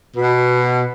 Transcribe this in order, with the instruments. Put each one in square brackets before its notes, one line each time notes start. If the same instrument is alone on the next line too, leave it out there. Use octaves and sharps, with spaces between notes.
[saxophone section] B2